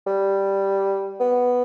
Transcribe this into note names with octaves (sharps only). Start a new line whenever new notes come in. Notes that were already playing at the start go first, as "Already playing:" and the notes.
G3
B3